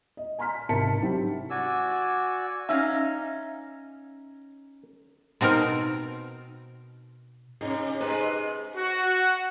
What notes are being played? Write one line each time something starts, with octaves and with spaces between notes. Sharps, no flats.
D#5
G#5 A#5 C6 F6 B6
G#1 C3 A#4 A5 B6 C#7
F#3 C4 E4 G4
F#4 D5 G#5 E6
C#4 D#4 E5 F5
B2 C4 D#4 A#4
C3 C#4 D#4 G#4
C3 G#3 D#4 B4
F#4